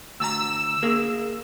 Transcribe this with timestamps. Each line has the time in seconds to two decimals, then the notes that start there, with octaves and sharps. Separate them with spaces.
0.20 D2 A5 A#5 E6
0.83 A#3 G#4 A#4